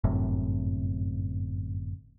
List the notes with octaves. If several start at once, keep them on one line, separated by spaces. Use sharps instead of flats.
G1 F#2 A2 C3